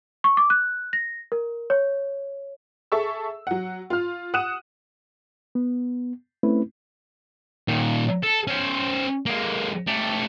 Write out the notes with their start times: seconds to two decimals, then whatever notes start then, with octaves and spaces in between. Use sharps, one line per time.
0.24 C#6
0.37 D6
0.50 F#6
0.93 A#6
1.32 A#4
1.70 C#5
2.92 G#4 A4 E5 C#6 E6
3.47 F#3 F#5
3.90 F4 F6
4.34 F#5 D#6 F#6 D#7 E7
5.55 B3
6.43 A3 C4 C#4 E4 B4
7.68 A#2 D#3
8.23 A4
8.47 C#4 C5
9.26 G#3 A#3
9.87 A3 G4